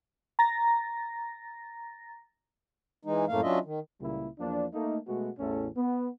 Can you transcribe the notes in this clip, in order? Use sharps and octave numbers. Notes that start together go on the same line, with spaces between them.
A#5 A6 A#6
E3 G#3 D#4
F#2 A2 A3 A#3 F5
F#3 C#4 D4 F4 D#5 E5
D#3
C#2 A#2 C#3 G3 A#3 E4
E2 F3 A#3 D4
A3 A#3 D#4
B2 G#3 A3 B3 F#4
A1 E2 A2 A3 C#4 A4
B3